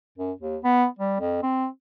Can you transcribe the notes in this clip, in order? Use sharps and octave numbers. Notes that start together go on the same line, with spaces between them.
F#2
D#2
B3
G3
F2
C4